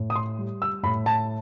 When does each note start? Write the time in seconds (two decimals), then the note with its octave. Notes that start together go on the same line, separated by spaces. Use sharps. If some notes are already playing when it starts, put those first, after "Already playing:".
Already playing: A2
0.10 D#6
0.16 C6
0.38 G3
0.62 E6
0.83 A2 B5
1.06 A5